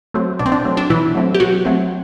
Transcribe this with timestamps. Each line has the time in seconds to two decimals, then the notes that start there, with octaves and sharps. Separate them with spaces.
0.14 F#3 A3 C4
0.39 B2 D4
0.46 C4
0.52 D4
0.65 F#3 A3 C4
0.77 D4
0.90 B2 E3 E4
1.15 F#3 A3 C4
1.35 G4
1.40 B2 F#3 F#4
1.65 F#3 A3 C4